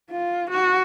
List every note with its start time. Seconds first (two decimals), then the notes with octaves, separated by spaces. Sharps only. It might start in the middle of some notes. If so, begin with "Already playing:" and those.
0.11 F4
0.50 F#4